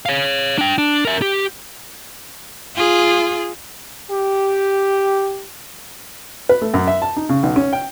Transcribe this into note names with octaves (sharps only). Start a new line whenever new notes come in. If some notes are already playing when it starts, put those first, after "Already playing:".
C#5 F5
D4 G5
D4
A#4 E5
G4
F4 G#4
G4
B4
A3
F#2
E5
A5
D#4
C#3
B1
C#4
G5